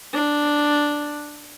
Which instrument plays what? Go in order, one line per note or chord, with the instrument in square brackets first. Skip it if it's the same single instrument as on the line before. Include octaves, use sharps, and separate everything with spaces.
[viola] D4